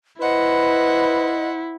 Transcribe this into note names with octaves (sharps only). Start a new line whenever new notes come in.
E4 B4 C5 D#5 F#5